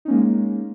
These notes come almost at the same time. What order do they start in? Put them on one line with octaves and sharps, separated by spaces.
D#4 C#4 A#3 G#3